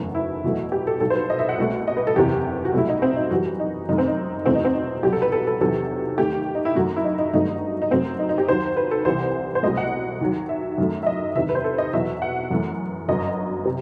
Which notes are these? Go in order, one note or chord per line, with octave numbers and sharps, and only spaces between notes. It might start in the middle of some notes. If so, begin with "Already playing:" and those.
Already playing: F#1 E2 D#3 F#3 A3
E4
E2 B2 F#3 A3
G4
A4
B1 B2 G3 A4
C5
B4
D#5
E5
F#5
C2 B2 A3
D#5
B4
A4
F#1 E2 C3 G4
F#4
C2 B2 F#3 A3 E4
D#4
C4
D#4
F#2 E3 G3 F#4
D#4
F#2 D#3 A3 D#4
C4
D#4
E2 B2 A3 C4
D#4
C4
D#4
C2 B2 F#3 G4
A4
B4
A4
A4
E2 C3 D#3 F#3 A4
D#2 D#3 A3 G4
D#4
E4
F#2 D#3 A3 F#4
E4
D#4
D#4
G1 G2 D#3 F#3 A3 D#4
D#4
F#2 F#3 A3 C4
D#4
D#4
G4
D#2 D#3 F#3 C5
B4
A4
C2 C3 E3 C5
C5
C2 B2 F#3 A3 D#5
F#5
D#2 D#3 F#3
E5
F#2 D#3 F#3 A3
E5
D#5
E2 C3 D#3 E5
B4
C5
A4
D#5
E2 B2 F#3 E5
F#5
F#2 E3 A3
G1 F#2 F#3 D#5
C3